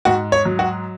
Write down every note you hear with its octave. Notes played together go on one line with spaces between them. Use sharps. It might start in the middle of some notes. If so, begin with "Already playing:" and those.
G#2 F#4
C#5
F#3
F#4